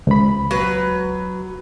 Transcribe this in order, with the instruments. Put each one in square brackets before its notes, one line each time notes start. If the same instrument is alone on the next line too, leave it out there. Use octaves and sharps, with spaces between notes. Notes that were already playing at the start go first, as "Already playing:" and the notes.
[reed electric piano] C#2 B5
[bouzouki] F#3 B4